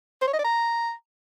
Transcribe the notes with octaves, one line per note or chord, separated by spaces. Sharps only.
C5
C#5
D#5
D5
A#5